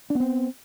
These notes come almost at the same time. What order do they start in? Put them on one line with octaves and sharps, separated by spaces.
D4 B3 C4